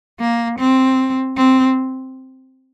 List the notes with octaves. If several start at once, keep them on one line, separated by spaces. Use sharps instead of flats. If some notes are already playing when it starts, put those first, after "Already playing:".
A#3
C4
C4